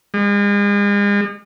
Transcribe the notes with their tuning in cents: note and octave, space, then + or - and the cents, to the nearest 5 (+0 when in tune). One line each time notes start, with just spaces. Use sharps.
G#3 -40